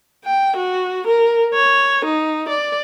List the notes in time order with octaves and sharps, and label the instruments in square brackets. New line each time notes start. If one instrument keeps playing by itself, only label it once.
[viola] G5
F#4
A#4
C#5
D#4
D5